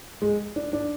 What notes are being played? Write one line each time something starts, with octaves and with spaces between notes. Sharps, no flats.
G#3
D4
D4